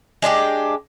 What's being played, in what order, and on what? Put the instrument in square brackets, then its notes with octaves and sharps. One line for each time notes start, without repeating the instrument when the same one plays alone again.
[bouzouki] G#3 D4 F4 G4